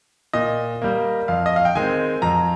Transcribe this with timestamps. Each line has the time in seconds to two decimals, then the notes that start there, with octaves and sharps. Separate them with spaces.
0.33 A#2 D#5
0.82 G3 A#3
1.28 F2 F5
1.46 D#5
1.56 F5
1.65 G5
1.75 D#3 G#3 C4 G#5
2.22 F2 A#5